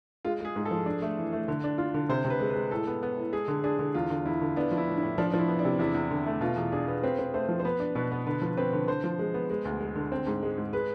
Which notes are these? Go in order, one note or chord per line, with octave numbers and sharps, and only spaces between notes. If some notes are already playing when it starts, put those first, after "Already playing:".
G#3 F4
G#3 G#4
G#2
A4
F3
D4
A3
E3
A3
D3
D4
F4
D3
C3 C5
C3
B4
G#3
B4
G#3
A2 A4
B3
B3
A2
G#3 G#4
D3
D4 G#4
D3
E2 F4
D3
E2 E4
D3
B3 D4
F3
E4
A2
E4
A2
F3 D4
F3 D4
E4
B3
D4
C3
E2 E4
E2
D3
A3
B2 F4
E2
D4 G#4
B3
C4 B4
C4
A3 C5
F3
C5
B3 B4
D4
B2 B4
B3
D3 B4
F3
C4 B4
D3
D3 C5
F3
G#3
B3
G#3
D2
G#3
D3
C4
G#2
G#3
G#2
G#3 B4